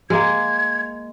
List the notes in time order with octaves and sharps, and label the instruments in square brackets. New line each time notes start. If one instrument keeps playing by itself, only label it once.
[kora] G#3 A#3 [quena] G#6